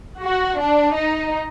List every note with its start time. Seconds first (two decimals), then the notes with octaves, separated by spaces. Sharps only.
0.23 F#4
0.60 D4
0.97 D#4